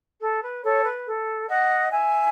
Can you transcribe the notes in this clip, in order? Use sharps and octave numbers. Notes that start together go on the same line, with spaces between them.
A4
B4
A4 C#5
B4
A4
D#5 F#5
E5 G#5